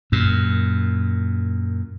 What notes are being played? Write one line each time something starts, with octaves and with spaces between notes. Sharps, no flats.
F#2 A#2